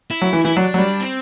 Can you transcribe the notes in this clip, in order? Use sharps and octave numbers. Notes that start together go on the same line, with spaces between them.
E4
F#3
E3
E3 E4
F#3 D4
F#3
G3
C4